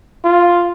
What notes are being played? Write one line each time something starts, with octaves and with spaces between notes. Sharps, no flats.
F4